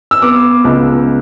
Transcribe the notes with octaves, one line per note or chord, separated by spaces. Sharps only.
E6
B3 D6
C#2